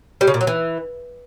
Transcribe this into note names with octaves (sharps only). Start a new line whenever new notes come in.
G3
C#3
A#2
F#3
E3